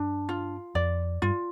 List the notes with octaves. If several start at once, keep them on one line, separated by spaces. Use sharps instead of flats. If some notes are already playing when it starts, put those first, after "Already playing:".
Already playing: G2 D4
F4
F2 D5
G2 F4